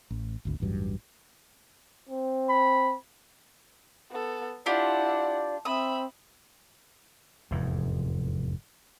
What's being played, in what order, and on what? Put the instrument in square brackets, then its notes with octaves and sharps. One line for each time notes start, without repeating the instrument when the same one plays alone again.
[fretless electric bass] A1
G#1 D2
A1 E2 G2 F#3
[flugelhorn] C4
[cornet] B5
[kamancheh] B3 A4
[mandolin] D4 F4 G4 [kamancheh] E4 F#5 [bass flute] D5
[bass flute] C4 [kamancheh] E5 B5 [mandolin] D#6
[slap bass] F1 E2 G#2